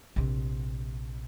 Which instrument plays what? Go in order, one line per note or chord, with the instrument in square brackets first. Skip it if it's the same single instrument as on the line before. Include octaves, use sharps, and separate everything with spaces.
[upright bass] A#1 C3